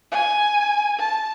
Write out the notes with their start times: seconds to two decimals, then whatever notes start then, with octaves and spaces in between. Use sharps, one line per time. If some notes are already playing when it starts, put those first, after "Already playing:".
0.12 G#5
0.99 A5